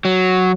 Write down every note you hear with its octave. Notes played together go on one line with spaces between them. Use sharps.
F#3